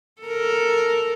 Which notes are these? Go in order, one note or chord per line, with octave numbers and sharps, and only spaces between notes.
A4 A#4